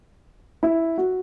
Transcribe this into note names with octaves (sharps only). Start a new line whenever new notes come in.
E4
F#4